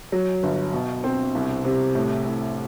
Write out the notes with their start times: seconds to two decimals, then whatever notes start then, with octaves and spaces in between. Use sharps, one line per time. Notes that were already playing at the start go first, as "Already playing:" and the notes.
0.12 F#3
0.43 G1
0.73 B2
1.04 C4
1.35 C2
1.65 C3
1.95 A2
2.26 A2